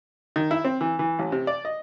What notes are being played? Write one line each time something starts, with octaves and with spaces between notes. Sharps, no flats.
D#3
E4
C4
E3
E3
A1
C3
D5
D#5